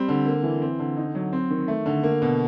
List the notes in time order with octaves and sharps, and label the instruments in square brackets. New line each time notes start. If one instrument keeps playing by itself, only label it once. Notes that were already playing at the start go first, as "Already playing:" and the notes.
Already playing: [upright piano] G3 C4
D3
A#3
E3
C4
D3
D#4
F#3
C4
D#3
A3
D3
A#3
B2